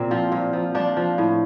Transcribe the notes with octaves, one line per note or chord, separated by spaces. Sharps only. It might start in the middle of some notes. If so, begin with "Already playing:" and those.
Already playing: A#2 C4
F3
A#2
F3
F3 D4
F3
A2